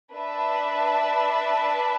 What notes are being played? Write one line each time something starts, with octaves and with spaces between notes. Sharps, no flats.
D4 B4 E5 A5